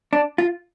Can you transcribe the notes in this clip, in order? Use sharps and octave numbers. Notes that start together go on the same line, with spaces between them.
D4
F4